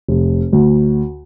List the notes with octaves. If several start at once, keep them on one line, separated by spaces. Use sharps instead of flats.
F1
D2